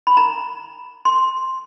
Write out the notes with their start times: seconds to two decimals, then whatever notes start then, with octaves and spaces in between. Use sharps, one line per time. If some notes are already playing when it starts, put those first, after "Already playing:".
0.07 B5
0.17 A#5
1.05 C6